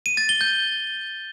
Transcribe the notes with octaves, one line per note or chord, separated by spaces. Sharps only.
D#7
A6
G7
G6